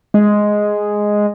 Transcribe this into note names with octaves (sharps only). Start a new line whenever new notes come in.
G#3